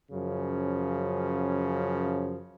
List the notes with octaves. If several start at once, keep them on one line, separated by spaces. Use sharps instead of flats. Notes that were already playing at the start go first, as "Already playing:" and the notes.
F#2 C#3 F3